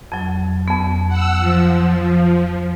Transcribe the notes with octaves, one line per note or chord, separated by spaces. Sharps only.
F2 F#3
F2 B3
F#5 E6
F3